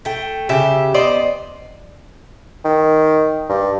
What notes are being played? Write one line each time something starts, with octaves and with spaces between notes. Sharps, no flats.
A3 G5
C#3 G4 E5
B3 C5 D5 D#5
D#3
G2